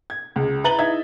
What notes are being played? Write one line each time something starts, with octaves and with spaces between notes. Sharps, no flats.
G#6
C#2
E4 B4 A#5 A6 F#7 G7
D#4 E4 E5 G#6